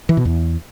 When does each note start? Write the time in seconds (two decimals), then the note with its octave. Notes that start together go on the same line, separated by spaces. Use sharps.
0.09 E3
0.17 B2
0.25 E2